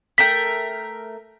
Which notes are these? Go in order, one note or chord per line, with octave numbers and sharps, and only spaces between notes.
A3 A#4 G5 B6